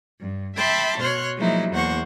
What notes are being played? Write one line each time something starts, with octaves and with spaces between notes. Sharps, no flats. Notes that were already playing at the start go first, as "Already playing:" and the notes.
G2
E5 G5 A5 B5 C6 D6
B2 C#5 C6 F6 F#6
F3 F#3 G#3 A#3 D#4 E4
E2 A#3 C5 F#5 C#6